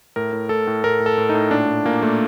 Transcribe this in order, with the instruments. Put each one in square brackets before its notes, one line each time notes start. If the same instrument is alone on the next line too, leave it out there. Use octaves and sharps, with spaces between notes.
[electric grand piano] A2 A#4
A2
A2 A4
A2
A2 A#4
A2
A4
A2
A2 D#4
A#2 D4
A#2
A#2 A#3
A#2 A3